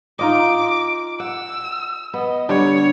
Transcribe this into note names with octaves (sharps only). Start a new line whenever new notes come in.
D#4 F4 D#5 D6
F#5 E6
B3 D#5
D3 G3 C#5